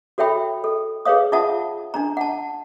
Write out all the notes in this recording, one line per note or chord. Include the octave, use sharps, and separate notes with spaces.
F#4 A4 C#5 E5 G5 B5
A4
G#4 B4 C#5 F5 D#6
D#4 F4 E5 F#5 A5 D#6
D4 D#4 A#5
F#5 A5